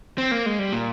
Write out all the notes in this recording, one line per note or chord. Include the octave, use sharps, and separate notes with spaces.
C4
A#3
G#3
G3
A#2